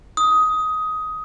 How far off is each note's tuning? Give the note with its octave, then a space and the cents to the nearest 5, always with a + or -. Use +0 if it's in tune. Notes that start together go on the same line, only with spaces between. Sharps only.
D#6 +15